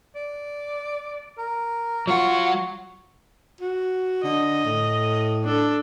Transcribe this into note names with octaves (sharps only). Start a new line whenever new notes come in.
D5
A#4
F#3 F4 F#5 C#6
F#4
D3 D#5
A2
D4 A4